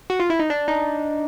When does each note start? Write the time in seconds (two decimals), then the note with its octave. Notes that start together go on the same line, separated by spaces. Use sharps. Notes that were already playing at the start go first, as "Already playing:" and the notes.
0.10 F#4
0.20 F4
0.30 E4
0.40 D#4
0.50 D4
0.68 D#4